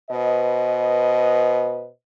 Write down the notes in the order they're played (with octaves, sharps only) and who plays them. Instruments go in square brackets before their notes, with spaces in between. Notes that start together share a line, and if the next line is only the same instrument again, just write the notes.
[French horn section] B2 B4 C5 D#5